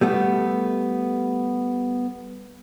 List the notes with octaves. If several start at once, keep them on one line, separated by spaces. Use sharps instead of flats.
G3 A3 B3